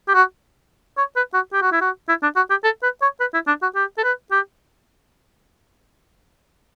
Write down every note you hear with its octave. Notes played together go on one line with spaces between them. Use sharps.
G4
F#4
C#5
B4
F#4
G4
F#4
E4
F#4
E4
D4
F#4
G4
A4
B4
C#5
B4
E4
D4
F#4
G4
A4
B4
G4